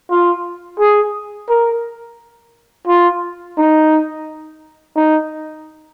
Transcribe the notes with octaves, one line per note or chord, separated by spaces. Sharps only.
F4
G#4
A#4
F4
D#4
D#4